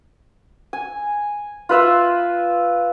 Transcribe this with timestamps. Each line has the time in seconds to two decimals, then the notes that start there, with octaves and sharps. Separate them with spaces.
0.73 G#5
1.69 F4 B4 E5 F5